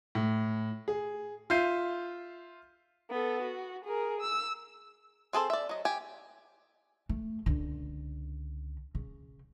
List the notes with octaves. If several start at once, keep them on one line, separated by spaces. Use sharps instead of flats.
A2
G#4
F4 E5 G6 C7 D#7
B3 A4
F#4
G#4 A#4
E6
C4 G#4 A4 C5
D5 E5
F#3 D#5
G4 G#5
A3
C#2 D3
C#3